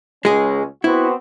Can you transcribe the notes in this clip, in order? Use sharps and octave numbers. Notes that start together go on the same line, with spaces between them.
C#2 G#3 C#4 G#4
B3 C4 E4 F#4